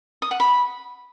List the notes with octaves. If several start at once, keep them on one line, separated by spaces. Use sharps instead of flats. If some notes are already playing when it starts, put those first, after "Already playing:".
D#6
F#5
B5